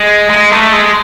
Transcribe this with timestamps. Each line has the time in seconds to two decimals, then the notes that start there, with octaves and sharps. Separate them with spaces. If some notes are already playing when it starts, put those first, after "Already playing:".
Already playing: G#3
0.30 G#3
0.52 A3
0.73 G#3